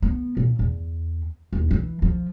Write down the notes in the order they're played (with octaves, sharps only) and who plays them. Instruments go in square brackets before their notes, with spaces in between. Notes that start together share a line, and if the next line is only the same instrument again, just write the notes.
[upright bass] B3
A#2
E2
D#2
E3
F3